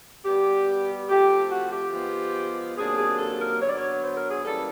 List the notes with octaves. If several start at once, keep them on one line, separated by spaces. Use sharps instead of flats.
B2 G3 B3 G4
F3 A3 C4 G4
F#4
G4
F3 G#3 B3
C3 D#3 F#3 A#3 D4 G#4
G#4
A4
A#4
D3 F#3 B3 C#5
D5
C#5
C5
A#4
G#4
E3 G3 A#3 C#4 A4